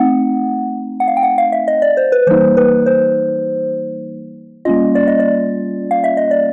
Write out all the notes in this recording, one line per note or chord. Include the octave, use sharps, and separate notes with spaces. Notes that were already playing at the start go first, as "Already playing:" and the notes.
Already playing: A3 C4 D#4 F#5
F#5
F5
G5
F#5
F5
E5
D#5
D5
C5
B4
E3 G3 A#3 D#4 C5
B4
C5
G3 A#3 C#4 F4 D#5
D5
D#5
D5
F5
E5
D#5
D5